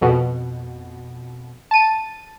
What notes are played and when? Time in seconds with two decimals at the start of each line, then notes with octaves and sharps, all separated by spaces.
0.01 F2 B2
1.71 A5 D#7